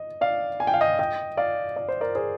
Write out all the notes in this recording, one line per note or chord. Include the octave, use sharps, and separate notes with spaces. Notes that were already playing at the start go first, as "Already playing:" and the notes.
Already playing: D#5
D5 F5
G#5
G5
F5
D#5 G5
D#5 G5
D5 F5
D5
C5
A#4 D5
G#4 C5